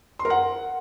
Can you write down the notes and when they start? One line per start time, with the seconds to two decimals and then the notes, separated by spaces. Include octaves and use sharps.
0.19 C6
0.25 A#4
0.30 F#5